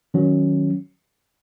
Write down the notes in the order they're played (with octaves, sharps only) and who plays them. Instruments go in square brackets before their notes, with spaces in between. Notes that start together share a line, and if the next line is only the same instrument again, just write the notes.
[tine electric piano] D#3 F#3 C#4